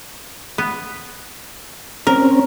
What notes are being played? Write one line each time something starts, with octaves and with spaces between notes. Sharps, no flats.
B3
C4 C#4 A#4